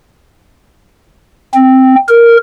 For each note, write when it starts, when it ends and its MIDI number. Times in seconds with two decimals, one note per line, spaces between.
1.54 1.95 60
2.08 2.37 70